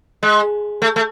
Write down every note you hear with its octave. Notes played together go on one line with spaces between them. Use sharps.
G#3
A3
A3